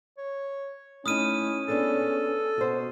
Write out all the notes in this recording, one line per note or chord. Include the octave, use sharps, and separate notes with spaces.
C#5
A3 C#4 D#4 E4 D#6 F6 D#7
B3 D4 G#4 A4
B2 F#4 C5